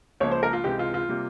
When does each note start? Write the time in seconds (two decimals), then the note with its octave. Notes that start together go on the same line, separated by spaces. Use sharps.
0.20 C#2 C#3 F3 A#3 C#5
0.31 C5
0.43 A#4
0.53 F4
0.64 C#2 C3 E3 G#3 G4
0.79 F4
0.94 F4
1.09 C3 G3 A#3